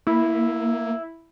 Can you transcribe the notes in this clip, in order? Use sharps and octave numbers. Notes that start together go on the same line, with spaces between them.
A#3 E4